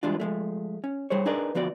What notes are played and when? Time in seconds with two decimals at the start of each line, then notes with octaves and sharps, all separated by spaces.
0.03 E3 G3 G#3 D4 F4
0.20 F3 G#3 A3
0.84 C#4
1.10 G3 G#4 C5 C#5
1.25 D4 D#4 G#4 A#4 B4 D5
1.55 D2 F3 B3 F#4 D5